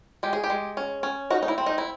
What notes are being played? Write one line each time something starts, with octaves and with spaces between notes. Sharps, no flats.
G#3 G4
G#4
G4
G#3
C#4
C#4
D#4 F#4
D#4
E4
C4
D#4
E4